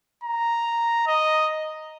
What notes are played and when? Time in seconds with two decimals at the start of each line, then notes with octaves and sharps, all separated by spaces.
0.24 A#5
1.07 D#5